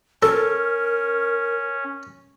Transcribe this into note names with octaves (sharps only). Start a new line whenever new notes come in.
C#4 A4 A#4